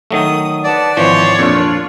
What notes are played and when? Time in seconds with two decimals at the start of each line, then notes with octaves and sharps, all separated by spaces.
0.11 D#3 F#3 A3 D#6
0.64 B4 D5 F#5 A5
0.97 G#1 E3 F3 C5 C#5 C6
1.39 F2 A#2 D4 F4